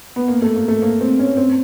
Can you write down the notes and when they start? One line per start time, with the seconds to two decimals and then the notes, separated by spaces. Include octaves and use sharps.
0.16 B3
0.28 A#3
0.42 A3
0.55 A#3
0.68 A3
0.82 A#3
1.01 C4
1.19 C#4
1.37 C4